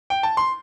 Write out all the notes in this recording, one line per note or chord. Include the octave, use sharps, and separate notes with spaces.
G5
A5
C6